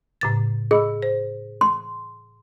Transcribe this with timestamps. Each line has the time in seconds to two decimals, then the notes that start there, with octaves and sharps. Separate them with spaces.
0.21 A2 C#3 A6
0.71 G#4 D#5 B5 E6
1.03 C5
1.61 C6